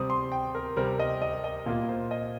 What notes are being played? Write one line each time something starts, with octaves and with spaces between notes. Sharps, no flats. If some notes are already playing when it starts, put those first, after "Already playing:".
Already playing: C3 G3 C4 D#6
C6
G5
A#4
C3 G3 C4 A#4
D#5
D#5
D#5
A#2 A#3 F4 F5
C5
D#5